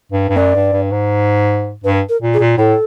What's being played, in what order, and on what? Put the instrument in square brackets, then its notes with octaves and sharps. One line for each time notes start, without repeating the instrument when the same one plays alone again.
[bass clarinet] G2
G2
[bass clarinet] F#2 [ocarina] D5
[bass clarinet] G2
G2
G#2
[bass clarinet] G2 [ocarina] B4
[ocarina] A#4
[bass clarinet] A#2
[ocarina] G#4
[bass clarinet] A#2
[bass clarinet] A2 [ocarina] A4